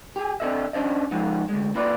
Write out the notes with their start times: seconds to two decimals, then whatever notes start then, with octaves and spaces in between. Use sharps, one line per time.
0.16 G4 G#4
0.40 C4 D4 F#4 A4 D#5 E5
0.73 C#4 D4 C5 D#5
1.11 F3 G#3 B3 D#4
1.49 D2 G#3
1.75 A#3 E4 F4 B4 D5